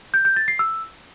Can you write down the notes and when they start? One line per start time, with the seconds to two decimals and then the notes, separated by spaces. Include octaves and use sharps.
0.14 G6
0.25 G6
0.36 A6
0.48 C7
0.59 E6